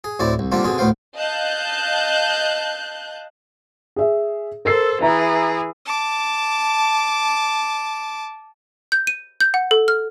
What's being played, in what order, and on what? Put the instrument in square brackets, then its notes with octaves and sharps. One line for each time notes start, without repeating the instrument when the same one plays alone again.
[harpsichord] G#4
D2 A2 C4 E4 D5
C2
D3 G3 A#3 C4 D4 F4
B2 D3 C4 G#4
D2 A2 B3 C5 F5 G5
[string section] D#5 F5 A5 F#6 G6
[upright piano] G#4 E5
[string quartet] A4 C5 [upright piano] A#4 E6 C7
[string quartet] E3 G#4 [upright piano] E5 A#5
[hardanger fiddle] A5 D6
[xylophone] G6
D#7
G6
F#5
A4
F6